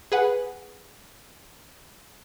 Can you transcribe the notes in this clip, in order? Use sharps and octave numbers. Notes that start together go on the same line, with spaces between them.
G#4 B4 F#5